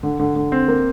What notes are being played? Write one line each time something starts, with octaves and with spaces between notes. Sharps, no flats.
D3
D3
D3
C4
A#3